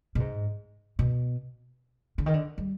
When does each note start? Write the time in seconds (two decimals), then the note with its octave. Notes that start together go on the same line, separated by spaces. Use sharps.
0.15 B2
0.20 G#2
0.99 B2
2.18 D3
2.26 D#3
2.34 D3
2.58 G3